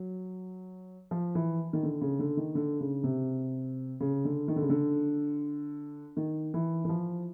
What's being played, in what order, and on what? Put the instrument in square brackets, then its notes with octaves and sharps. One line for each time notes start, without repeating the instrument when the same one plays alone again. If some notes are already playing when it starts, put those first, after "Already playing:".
Already playing: [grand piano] F#3
F3
E3
D#3
D3
C#3
D3
D#3
D3
C#3
C3
C#3
D3
D#3
D3
C#3
D3
D#3
E3
E3
F3